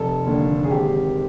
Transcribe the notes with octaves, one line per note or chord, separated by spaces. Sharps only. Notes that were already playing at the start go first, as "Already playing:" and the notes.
Already playing: F1 A4
D#2 D3
G#4
G#1 G4